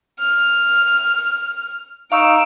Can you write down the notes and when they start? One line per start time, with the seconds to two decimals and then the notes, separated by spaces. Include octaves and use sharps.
0.19 F6
2.12 D#4 F5 C#6 E6 D7 E7